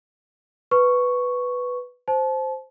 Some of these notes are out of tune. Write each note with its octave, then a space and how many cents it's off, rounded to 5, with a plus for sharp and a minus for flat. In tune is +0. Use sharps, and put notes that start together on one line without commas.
B4 +0 C#6 +0
C5 +0 A5 -30